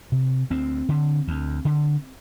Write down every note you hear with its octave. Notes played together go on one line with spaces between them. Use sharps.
C3
D2 C4
D3
D2
D3